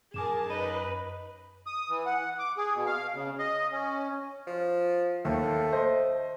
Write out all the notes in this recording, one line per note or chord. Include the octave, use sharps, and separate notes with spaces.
F#2 G#4 A#4 G#5 A5 D6 E7
D#4 B4 D#5 B5
D#6
E3
F#5
D6
G#4
B2
F5
C#3
D#5
C#4
F3
D#2 A3
C5 D#5